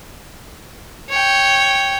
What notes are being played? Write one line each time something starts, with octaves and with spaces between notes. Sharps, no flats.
C#5 G5